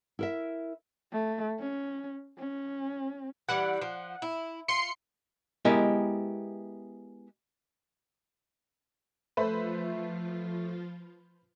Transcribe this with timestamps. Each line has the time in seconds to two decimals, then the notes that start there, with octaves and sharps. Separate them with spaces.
0.19 E4 A#4 E5
1.12 A3
1.60 C#4
2.39 C#4
3.49 E3 G3 F#5
3.81 F3
4.22 E4
4.68 F4 C6 C7 C#7
5.65 G#3 B3 E4 G4 A#4 D#5
9.37 F3 A3 F4 B4 C5 E5 B5